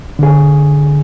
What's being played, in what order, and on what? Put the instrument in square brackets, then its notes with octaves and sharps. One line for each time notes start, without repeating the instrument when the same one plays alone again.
[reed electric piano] D3 G#4